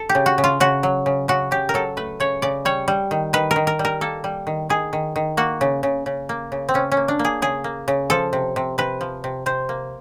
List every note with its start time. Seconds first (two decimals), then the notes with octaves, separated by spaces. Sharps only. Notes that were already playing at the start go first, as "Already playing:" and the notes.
Already playing: A4
0.09 G4
0.15 C#3
0.26 F#4
0.38 C#3
0.44 F4
0.60 C#3 F#4
0.83 F#3
1.06 C#3
1.28 C#3 F#4
1.51 C#3 G4
1.69 A#4
1.74 F#3 A4
1.97 A3 B4
2.20 C#3 C#5
2.42 C#3 D5
2.65 G3 C#5
2.88 G3
3.11 D#3
3.33 D#3 B4
3.51 A#4
3.56 D#3
3.67 A#4
3.79 G3
3.85 A#4
4.01 A#3 A4
4.24 G3
4.47 D#3
4.69 D#3 G#4
4.93 D#3
5.16 D#3
5.37 A#3 F#4
5.61 C#3
5.83 C#3
6.06 C#3
6.29 A#3
6.52 C#3
6.69 C4
6.74 C#3 C#4
6.92 C#4
6.97 A#3
7.08 D4
7.19 A#3
7.25 G#4
7.42 C#3 G#4
7.64 A#3
7.88 C#3
8.10 F3 A4
8.33 C3
8.56 C3
8.78 C3 B4
9.01 F3
9.24 C3
9.46 C3 C5
9.69 A#3